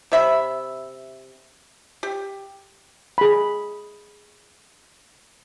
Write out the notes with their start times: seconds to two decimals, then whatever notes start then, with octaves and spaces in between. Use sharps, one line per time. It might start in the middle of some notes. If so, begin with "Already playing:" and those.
0.12 C3 E5 B5
2.03 G4
3.18 G#4 B5